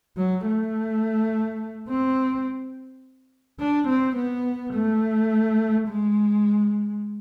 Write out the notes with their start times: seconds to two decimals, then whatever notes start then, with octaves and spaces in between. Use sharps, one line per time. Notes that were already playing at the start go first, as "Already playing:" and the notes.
0.17 F#3
0.46 A3
1.89 C4
3.59 D4
3.88 C4
4.16 B3
4.74 A3
5.88 G#3